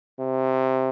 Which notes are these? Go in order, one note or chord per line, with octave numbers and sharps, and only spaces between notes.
C3